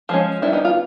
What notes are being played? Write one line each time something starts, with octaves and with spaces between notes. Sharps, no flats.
F3 G#3 C#4
D#3 G3 B3 D4 E4
D#4
F4